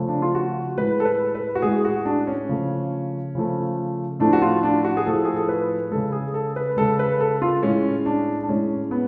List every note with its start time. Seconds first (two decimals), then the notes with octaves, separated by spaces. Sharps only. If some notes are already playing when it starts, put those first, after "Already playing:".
Already playing: C#3 F3 A3
0.08 D4
0.22 F4
0.35 F#4
0.77 A2 G#3 B4
1.00 A4
1.05 B4
1.35 B4
1.55 F#4
1.62 A2 G#3 G#4
1.85 F#4
2.05 D4
2.27 C#4
2.49 C#3 F3 A3
3.35 C#3 F3 A3
4.20 A2 F3 A3 D4
4.33 F#4
4.42 F4
4.63 D4
4.84 F#4
4.97 G#4
5.06 A2 F3 A3 A4
5.25 G#4
5.36 A4
5.48 B4
5.91 C#3 G#3 A4
6.12 G#4
6.34 A4
6.56 B4
6.77 C#3 G#3 A4
6.99 B4
7.21 A4
7.42 F4
7.62 A2 G#3 C#4
8.06 D4
8.43 D4
8.49 A2 G#3 C#4
8.91 B3